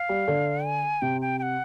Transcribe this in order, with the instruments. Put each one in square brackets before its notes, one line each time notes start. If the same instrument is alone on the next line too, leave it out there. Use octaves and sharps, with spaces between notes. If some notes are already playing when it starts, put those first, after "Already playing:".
Already playing: [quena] F5
[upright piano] G3
D3
[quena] G#5
[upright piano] C3 [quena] G5
[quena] G5
G5
F#5